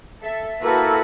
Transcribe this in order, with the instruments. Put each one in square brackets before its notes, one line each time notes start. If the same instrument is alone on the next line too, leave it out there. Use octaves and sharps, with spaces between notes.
[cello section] A4 E5
[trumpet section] A#3 E4 A4 [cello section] F#4 B4